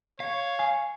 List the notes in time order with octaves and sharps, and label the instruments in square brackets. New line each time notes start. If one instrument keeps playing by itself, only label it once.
[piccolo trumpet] C#5 [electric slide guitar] F5
[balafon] G#5